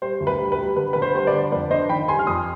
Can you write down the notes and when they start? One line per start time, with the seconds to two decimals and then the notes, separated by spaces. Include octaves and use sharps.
0.02 G3 C5
0.21 D2
0.27 B4
0.39 G3
0.52 B4
0.58 G3
0.76 D3 B4
0.93 D3 B4
1.02 C5
1.15 G3 C5
1.27 B4 D5
1.33 D3
1.52 F2 B4 D5
1.71 D4 C5 D#5
1.89 D#3 G5 B5
2.08 G3 G#5 C6
2.19 F6
2.27 F2 C6 D#6